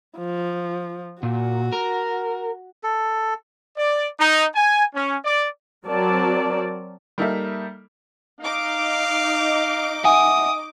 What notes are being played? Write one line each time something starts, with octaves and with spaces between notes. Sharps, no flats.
F3
A#2 F#4
A#4
A4
D5
D#4
G#5
C#4
D5
F#3 C4 A#4 D5 A5
G3 A#3 D#4 A4 E5
D#4 D#5 F5 D6
E5 F#5 G#5 D#6